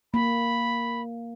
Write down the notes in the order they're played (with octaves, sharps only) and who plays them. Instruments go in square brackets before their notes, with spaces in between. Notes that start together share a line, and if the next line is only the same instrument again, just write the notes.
[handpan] A#3 [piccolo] B5